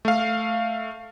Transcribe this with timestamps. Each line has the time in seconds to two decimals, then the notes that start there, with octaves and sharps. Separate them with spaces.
0.05 A3 F5